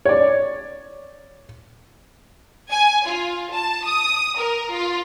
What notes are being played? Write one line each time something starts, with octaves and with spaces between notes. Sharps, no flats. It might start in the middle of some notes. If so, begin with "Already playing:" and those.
C#5 D5
G#5
F4
A5
D#6
A#4
F4